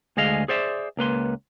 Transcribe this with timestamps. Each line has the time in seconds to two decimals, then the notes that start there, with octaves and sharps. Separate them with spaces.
0.17 D2 G#3 G#4 D#5 F5
0.48 G#4 C5 D5 E5
0.97 C#2 A#3 B4 C6